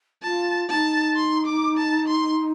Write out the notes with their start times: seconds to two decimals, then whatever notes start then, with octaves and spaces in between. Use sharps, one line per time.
0.23 F4 A5
0.70 D#4 A5
1.16 C6
1.47 D6
1.78 A5
2.08 C6